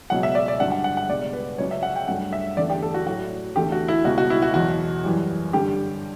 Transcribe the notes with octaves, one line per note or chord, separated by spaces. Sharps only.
C#2 B2 F#3 F#5
E5
D5
D5
G2 D3 F#3 F#5
F#5
F#5
F#5
C#2 B2 G3 D5
B4
C#2 C#3 F#3 C#5
E5
F#5
G5
G2 F#3 A3 F#5
E5
E2 D3 A3 D5
G4
A4
F#4
A2 F#3 A3 F#4
E2 D3 A3 G4
F#4
E4
C#2 B2 G3 F#4
F#4
E4
F#4
E2 B2 F#3 F#4
F#2 E3 G3
G2 D3 G3 G4